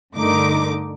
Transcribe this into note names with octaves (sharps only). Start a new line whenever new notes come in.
G2 D3 A3 D#4 A#4 D6